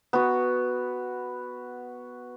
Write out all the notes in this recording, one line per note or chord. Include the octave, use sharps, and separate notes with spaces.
B3 F#4